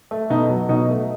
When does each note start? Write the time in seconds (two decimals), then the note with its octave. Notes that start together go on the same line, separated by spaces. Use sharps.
0.11 A3
0.30 B2 D#4
0.50 F#3
0.69 B2 D#4
0.89 A3